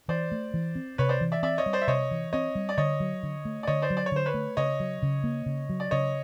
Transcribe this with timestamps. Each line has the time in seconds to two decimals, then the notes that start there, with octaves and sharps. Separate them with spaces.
0.08 E3 C5 D5
0.31 A3
0.54 E3
0.75 C4
0.98 C3 B4 C#5
1.09 C5 D5
1.21 E3
1.32 D5 E5
1.43 C4 D5 E5
1.58 C#5 D#5
1.66 G3
1.73 C5 D5
1.82 E5
1.87 C3 C#5 D#5
2.11 E3
2.33 C4 C#5 D#5
2.55 G3
2.69 D5
2.78 D3 C#5 D#5
3.00 F#3
3.23 D3
3.45 A3
3.63 D5
3.67 D3 C#5 D#5
3.82 C5 D5
3.90 F#3
3.97 D5
4.06 C#5
4.12 D3 C5
4.26 B4 C#5
4.34 A3
4.57 C#3 C#5 D#5
4.80 F#3
5.02 C#3
5.24 A#3
5.46 C#3
5.69 F#3
5.80 D5
5.91 C#3 C#5 D#5